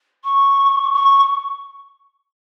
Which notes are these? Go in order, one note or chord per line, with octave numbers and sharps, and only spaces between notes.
C#6
C#6